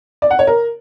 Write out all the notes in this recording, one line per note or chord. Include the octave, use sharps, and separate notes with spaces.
D5
F#5
C#5
A#4